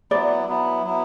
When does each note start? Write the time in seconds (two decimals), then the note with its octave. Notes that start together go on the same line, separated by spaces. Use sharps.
0.11 F#3 B3 E4 D5
0.48 F#3 B3 E4
0.84 F#3 B3 E4